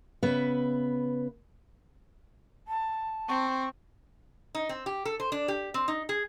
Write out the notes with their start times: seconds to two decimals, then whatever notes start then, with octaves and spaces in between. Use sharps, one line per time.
0.23 C#3 B3 B4 E5
2.68 A5
3.28 C4 C#6
4.55 D#4
4.69 C4
4.86 G4
5.05 A4
5.20 C5
5.32 D4
5.48 G4
5.74 C4
5.88 D#4
6.09 G#4